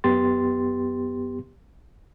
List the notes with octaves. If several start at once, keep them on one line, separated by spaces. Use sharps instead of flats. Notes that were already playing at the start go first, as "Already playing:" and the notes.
F#2 B3 G4 C6 A6